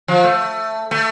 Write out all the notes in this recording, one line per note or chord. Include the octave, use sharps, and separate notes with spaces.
F3
A3
A3